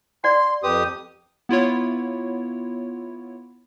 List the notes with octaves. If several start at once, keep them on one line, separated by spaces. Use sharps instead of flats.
D5 F#5 C6
F2 G4 B4 D#6
B3 E4 F4 C#5